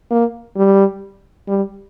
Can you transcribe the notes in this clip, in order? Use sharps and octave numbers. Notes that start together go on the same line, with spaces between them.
A#3
G3
G3